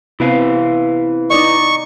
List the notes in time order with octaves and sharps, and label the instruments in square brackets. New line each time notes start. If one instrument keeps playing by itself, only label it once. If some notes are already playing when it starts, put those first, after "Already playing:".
[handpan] C3 B3 C4 [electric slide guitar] E4 B4 F5
[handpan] D#4 D5 D#5 [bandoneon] C#6